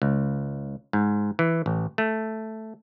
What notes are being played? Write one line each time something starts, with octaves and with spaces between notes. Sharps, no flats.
C#2
G#2
E3
A1
A3